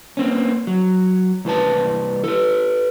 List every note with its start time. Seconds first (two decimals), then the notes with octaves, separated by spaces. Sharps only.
0.17 A#3 C4 C#4
0.67 F#3
1.45 C2 E3 B4 A5
2.24 A4 B4